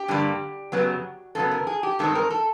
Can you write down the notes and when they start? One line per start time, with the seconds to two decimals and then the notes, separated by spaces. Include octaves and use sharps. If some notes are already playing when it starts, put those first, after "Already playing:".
Already playing: G4
0.08 G2 D3 G3 A#3
0.72 F#2 C#3 F#3 B3
1.35 F#2 C#3 F#3 B3 A4
1.51 A#4
1.67 G#4
1.83 G4
1.99 G2 D#3 G#3 C4 A4
2.15 A#4
2.30 A4